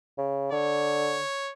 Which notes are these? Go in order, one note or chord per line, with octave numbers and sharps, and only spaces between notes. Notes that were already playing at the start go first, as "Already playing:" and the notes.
C#3
D3 C#5